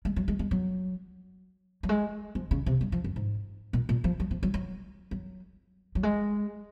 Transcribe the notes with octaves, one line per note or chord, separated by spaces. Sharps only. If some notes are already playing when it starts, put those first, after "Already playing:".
G#3
F#3
G#3
G#3
F#3
F#3
G#3
F3
C#3
C3
F#3
F3
F#2
G#2
A#2
A#2
F3
F#3
F3
F#3
F#3
F#3
F#3
G#3